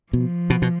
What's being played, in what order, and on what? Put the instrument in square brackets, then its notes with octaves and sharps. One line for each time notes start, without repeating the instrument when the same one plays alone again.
[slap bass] B2 [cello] F3
[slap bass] B2
B2